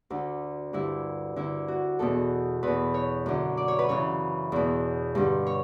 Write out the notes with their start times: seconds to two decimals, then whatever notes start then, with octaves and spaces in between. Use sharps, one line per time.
0.10 D2 D3
0.73 G2 D3 E4
1.36 D2 D3 E4
1.68 F#4
1.99 E2 B2 A4
2.63 E2 B2 B4
2.94 C#5
3.26 F#2 D3
3.57 D5
3.68 C#5
3.79 B4
3.89 F#2 C#3 E3 C#5
4.52 E2 B2
5.15 G2 D3
5.47 C#5